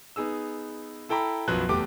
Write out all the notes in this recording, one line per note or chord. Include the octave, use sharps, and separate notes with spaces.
B3 D#4 G#4 E6
E4 A4 G5 A#5 B5
B1 F#2 F3 F#3 B4 F#6
F1 E2 A3 G4 D6